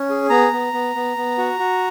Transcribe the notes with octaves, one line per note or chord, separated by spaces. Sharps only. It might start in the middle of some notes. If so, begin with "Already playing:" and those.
Already playing: C#4
G#4
B3 A#5
B3
B3
B3
B3
F#4
F#4